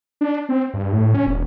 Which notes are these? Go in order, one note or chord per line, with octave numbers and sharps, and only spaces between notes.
D4
C4
G2
A2
C#4
E1